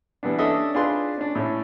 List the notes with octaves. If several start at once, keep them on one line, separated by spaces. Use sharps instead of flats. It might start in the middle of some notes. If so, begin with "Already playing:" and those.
E3 G3 B3 D4
C#4 D4 A4 D#5 E5
D4 D#4 F4 G#4 B4 C6
C#4 D4
A2 C#4